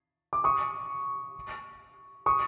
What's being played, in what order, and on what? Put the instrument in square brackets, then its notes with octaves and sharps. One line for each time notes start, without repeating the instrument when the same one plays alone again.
[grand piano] D6
C#6 D#6
C#6 D#6